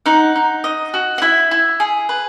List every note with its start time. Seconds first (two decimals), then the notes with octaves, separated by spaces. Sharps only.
0.06 D#4 F#5
0.36 D#4
0.64 D#5
0.94 F#4
1.18 F#5
1.22 E4 E5
1.51 E4
1.80 G#4
2.09 B4